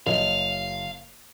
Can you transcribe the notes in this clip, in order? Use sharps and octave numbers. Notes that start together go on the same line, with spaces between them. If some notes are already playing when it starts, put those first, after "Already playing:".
F#1 D#5 F5 F7